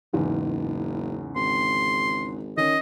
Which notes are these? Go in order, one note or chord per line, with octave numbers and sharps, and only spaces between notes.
F#1 E2 G#2 C#3
G#1 C6
D#3 C#4 D#5